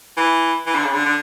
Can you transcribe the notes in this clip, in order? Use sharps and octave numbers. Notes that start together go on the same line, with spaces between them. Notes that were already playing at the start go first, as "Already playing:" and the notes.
E3
E3
D3
C#3
D3
D3